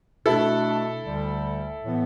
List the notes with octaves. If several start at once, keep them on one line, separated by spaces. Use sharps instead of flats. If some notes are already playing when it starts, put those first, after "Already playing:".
B2 A3 D4 E4 A4
D2 D3 G3
A2 E3 B3